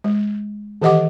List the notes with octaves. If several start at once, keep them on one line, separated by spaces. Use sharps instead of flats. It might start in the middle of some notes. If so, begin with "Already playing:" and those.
G#3
D#3 E3 G4 D#5 F#5 D6